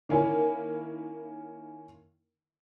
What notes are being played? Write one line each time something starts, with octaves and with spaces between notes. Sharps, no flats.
D#3 A#3 C#4 E4